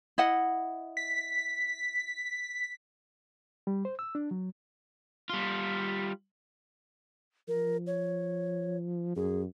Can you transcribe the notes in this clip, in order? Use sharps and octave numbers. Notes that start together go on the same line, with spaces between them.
E4 D#5 F#5
B6
G3
C5
E6
D4
F#3
G3 F4
F3 A#4
C#5
F#2 G#4